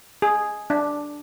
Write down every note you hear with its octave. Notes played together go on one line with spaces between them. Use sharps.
G#4
D4